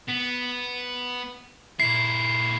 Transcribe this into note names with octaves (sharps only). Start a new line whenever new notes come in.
B3
A#2 E4 C7